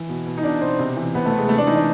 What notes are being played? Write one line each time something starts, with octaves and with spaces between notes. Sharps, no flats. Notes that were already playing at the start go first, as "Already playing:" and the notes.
Already playing: E3
B2
B2
D#4
B2 D4
B2 C4
C3
E3
C3 B3
A3
E3
G#3
C3 A3
D4
E3 D#4
D4